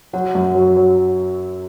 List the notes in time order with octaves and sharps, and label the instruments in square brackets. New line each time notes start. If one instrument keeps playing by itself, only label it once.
[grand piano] F#3 [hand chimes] F#4 F#5
[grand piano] F#2
F#3
F#3